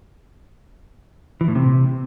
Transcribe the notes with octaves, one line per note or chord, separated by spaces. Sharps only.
E3
A2
C3